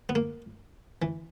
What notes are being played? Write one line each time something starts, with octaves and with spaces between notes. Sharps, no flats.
B3
A#3
E3